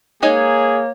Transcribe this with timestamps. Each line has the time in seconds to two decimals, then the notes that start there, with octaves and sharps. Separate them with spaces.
0.23 G#3 A#3 D#4 G#4 C#5 G#5